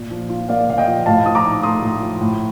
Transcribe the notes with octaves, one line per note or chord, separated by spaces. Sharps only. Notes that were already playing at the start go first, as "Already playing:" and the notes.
Already playing: A#2
F3
F4
A#3 D5 F5
A#2 F5
D#5 G5
F3
A2 F5 A5
F3 D#6
A#5 D6
D#4
A3 C6 D#6
A2
F3
A2